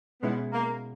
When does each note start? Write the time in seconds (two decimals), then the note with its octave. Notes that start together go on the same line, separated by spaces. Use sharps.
0.22 B2 G#3 B3 C#4 E4
0.53 A#3